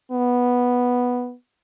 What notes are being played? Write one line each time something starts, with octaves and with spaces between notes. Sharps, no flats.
B3